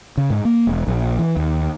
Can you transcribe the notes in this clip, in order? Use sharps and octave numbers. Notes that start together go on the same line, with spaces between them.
C#3
G#2
A#3
E1
A#1
E3
D#2